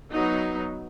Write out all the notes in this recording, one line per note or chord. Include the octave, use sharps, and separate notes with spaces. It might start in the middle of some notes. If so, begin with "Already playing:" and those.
F#3 B3 D#4